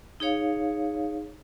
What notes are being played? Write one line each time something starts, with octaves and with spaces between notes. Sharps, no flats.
D#4 G#4 C#5 F5